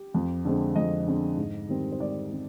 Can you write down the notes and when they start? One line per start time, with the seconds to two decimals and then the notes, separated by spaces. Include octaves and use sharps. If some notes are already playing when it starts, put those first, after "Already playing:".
Already playing: G4
0.15 F2
0.45 D3 G#3 C4
0.76 F2 D#5
1.07 D3 G#3 C4
1.37 G#2
1.69 D#3 G3 C4
1.92 C5
2.00 G#2 D5
2.31 D#3 G3 C4